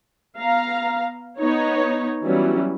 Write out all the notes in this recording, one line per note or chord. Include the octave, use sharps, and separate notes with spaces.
B3 F5 A#5
B3 D#4 C#5
E3 F#3 G3 B3 C#4 E4